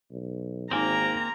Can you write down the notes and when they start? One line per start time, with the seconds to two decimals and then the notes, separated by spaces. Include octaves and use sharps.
0.11 B1
0.71 G#1 A#3 C4 D#4 G#5 A#5 A#6